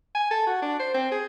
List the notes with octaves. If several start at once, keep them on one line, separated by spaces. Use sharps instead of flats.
G#5
A4
F#4
D4
C5
C4
G#4